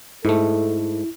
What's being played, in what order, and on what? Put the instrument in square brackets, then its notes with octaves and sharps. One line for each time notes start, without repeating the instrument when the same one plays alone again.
[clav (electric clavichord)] G#2 A3 [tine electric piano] E4 [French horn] A4